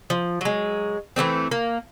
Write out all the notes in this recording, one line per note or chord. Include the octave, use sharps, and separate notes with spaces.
F3
F#3 G#3
E3 F3 A3 C4
A#3